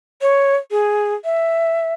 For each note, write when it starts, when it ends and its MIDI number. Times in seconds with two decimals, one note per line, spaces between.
0.21 0.56 73
0.71 1.14 68
1.24 1.94 76